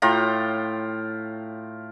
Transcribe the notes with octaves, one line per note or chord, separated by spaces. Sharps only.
A2 F4 G5 A#5